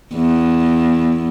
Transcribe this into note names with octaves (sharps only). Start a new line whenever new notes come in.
E2